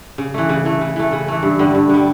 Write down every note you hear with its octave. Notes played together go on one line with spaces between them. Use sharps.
C#3
E3 A3
C#3
E3 A3
C#3
E3 A3
C#3
E3 A3
G2
D3 G3
G2
D3 G3